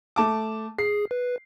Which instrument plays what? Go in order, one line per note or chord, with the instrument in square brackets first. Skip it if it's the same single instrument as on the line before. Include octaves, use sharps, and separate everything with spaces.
[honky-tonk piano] A3 A5 D6
[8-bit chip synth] G#4 [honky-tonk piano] C7
[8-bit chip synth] B4